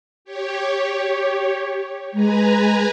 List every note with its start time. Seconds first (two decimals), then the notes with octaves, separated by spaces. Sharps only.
0.25 G4 C#5
2.14 G#3 B4 G#5 A#5